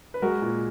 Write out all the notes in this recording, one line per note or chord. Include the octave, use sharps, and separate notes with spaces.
B4
G#3 F#4 A#4
A#2